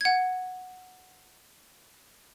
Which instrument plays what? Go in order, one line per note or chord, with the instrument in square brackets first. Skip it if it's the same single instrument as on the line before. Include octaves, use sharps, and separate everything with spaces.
[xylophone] F#5 G#6